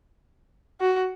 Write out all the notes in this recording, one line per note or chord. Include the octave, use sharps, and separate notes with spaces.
F#4